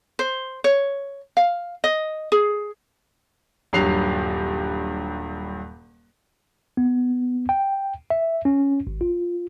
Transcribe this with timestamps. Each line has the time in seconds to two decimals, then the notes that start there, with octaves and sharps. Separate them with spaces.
0.19 C5
0.64 C#5
1.37 F5
1.84 D#5
2.32 G#4
3.73 D#1 G2 F#3 F#6 C7 F7
6.77 B3
7.49 G5
8.10 E5
8.45 C#4
8.87 G#1
9.01 F4